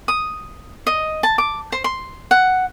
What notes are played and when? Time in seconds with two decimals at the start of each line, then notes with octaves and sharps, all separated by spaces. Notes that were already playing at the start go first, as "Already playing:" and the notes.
0.08 D#6
0.87 D#5
1.23 A5
1.38 D6
1.72 C5
1.84 C6
2.31 F#5